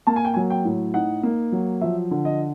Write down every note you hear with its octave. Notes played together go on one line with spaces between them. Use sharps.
A#3 A5
G#5
G5
G#5
F#3
G5
A2
D#4 F#5
A#3
F#3
F3 E5
D3
D#5